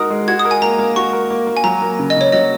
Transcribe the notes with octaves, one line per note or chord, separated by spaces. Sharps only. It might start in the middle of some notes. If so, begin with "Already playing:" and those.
Already playing: G#3 D#4 F#4 A#4 D#6
G#3
F#4 G#6
D#6
A#4
G#5
A#3 A#5
A#3
F#4 C#6
A#4
A#3
A#3
G#5
F#3 A#5
A#3
C#3
D#5
C#3 C#5
F#3 D#5